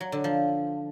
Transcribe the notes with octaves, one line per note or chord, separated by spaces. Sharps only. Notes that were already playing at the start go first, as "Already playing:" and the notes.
F#3
D3
F3